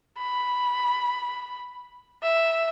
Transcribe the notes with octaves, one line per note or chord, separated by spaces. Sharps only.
B5
E5